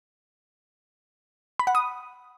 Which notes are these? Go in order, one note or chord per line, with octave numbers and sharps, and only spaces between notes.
B5
F#5
D#6